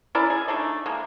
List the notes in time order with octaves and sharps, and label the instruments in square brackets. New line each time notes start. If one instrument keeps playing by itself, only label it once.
[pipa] C#4 E4 A#4 D5
G#4
A3 D4 D#4
D3 G#3 A#3